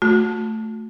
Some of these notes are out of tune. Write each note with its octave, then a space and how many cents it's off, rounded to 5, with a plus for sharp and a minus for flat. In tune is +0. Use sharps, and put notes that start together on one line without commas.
A3 +0 F#4 -35